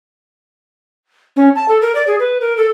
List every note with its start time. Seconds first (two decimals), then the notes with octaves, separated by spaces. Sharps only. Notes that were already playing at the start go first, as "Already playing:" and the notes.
1.36 C#4
1.55 A5
1.68 A4
1.82 A#4
1.95 D5
2.07 G#4
2.19 B4
2.41 A#4
2.57 A4